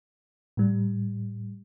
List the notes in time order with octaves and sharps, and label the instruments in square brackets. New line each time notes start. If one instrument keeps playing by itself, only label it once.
[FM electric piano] A2 G3